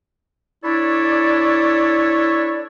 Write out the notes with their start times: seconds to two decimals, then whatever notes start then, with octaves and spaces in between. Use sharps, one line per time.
0.64 D4 E4 A4 C#5 D5